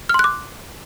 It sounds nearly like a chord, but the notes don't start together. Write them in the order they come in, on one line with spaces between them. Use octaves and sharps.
F6 C6 F#6 D6